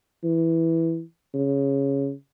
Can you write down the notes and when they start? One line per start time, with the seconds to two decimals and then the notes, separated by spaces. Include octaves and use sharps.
0.24 E3
1.34 C#3